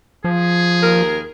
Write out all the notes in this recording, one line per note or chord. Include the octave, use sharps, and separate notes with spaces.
F3 G#4
D#2 A#4